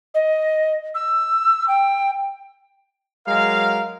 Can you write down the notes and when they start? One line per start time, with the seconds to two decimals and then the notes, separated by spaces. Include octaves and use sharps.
0.14 D#5
0.95 E6
1.68 G5
3.27 F#3 G#3 A#4 F5